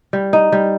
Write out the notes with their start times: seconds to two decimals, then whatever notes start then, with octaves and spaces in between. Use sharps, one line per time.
0.13 G3
0.33 D#4
0.52 G3